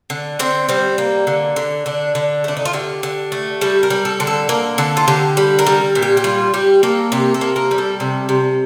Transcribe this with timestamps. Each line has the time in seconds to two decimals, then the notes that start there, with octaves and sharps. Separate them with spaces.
0.10 D3
0.39 D3 C4
0.69 G3 C4
0.98 A#3
1.27 D3
1.56 D3
1.86 D3 D4
2.15 D3
2.44 A3 D4
2.57 D#4
2.65 F4
2.73 D3 G4
3.03 D3
3.32 A3
3.61 G3 A4
3.83 A#4
3.90 G3
4.05 A4
4.20 D3
4.27 A4
4.49 A#3 A#4
4.78 D3 A4
4.97 F4
5.08 D3 G4
5.37 G3
5.59 A#4
5.67 G3
5.95 A#2
6.02 G4
6.17 G4
6.24 G3 F4
6.54 G3 G4
6.83 A#3 A4
7.12 C3 G4
7.34 A4
7.41 A#3
7.56 A#4
7.71 G3
7.78 A4
8.00 C3 A4
8.29 C3